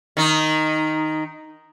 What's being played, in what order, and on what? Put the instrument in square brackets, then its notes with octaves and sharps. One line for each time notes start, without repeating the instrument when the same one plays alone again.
[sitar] D#3 D#4